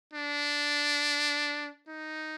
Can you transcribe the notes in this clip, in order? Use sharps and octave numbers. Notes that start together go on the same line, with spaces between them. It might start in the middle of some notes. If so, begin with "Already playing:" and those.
D4
D#4